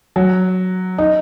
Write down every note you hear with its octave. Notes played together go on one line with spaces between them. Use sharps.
F#3
D#4